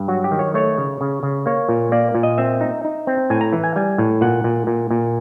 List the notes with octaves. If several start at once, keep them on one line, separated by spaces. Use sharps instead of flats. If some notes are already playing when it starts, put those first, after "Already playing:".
Already playing: G2
F#3 F#4
G4
D#3
C#5
A3 C#5
C#3
C#3
C#3
A#3 C#5
A#2
A#3 D5
A#2
D#5
C4 E5
D#4
D#4
C4
A2 G#5
A#5
E3
G#5
G3 G#5
A2
A#2 F#5
A#2
A#2
A#2